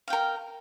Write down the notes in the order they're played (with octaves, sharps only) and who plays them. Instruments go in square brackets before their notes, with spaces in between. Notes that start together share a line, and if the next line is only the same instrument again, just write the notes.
[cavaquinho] F5
G5
A#4